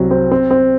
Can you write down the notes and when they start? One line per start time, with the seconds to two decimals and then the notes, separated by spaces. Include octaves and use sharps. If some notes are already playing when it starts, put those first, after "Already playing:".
Already playing: C2 F#3 C4
0.11 C4
0.31 C4
0.51 C4